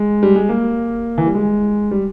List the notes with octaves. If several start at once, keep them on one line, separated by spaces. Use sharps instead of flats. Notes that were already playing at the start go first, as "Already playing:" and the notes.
Already playing: G#3
G3
G#3
A#3
E3
G3
G#3
G3